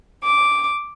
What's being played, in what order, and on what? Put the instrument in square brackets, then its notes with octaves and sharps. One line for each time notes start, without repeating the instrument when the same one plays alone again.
[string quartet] D6